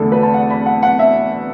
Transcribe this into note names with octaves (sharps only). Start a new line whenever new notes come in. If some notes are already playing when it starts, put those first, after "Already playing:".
Already playing: E2 D3 A3 A4
B4
A5
F#5
B5
F#5
F#5
E5